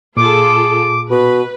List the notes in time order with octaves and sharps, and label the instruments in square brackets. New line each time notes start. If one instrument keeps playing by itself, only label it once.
[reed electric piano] A#2 [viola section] F4 G#4 A4 [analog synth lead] D6
[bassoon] B2 [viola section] B4